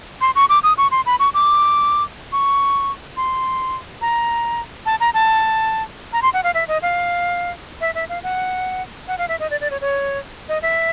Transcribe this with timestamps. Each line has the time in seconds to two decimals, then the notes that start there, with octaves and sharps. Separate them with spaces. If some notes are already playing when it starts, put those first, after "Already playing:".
0.21 C6
0.36 C#6
0.49 D6
0.63 D#6
0.78 C#6
0.91 C6
1.06 B5
1.19 C#6
1.34 D6
2.32 C#6
3.17 C6
4.01 A#5
4.86 A5
5.00 A#5
5.14 A5
6.13 A#5
6.22 C6
6.33 F#5
6.44 F5
6.54 E5
6.68 D#5
6.82 F5
7.81 E5
7.95 E5
8.09 F5
8.23 F#5
9.08 F#5
9.18 F5
9.29 E5
9.40 D#5
9.50 D5
9.61 D5
9.71 C#5
9.81 C#5
10.49 D#5
10.62 E5